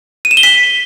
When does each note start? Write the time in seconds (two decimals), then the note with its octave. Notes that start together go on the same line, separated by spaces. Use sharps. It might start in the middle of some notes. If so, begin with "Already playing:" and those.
0.25 D#7
0.31 E7
0.37 G7
0.43 B6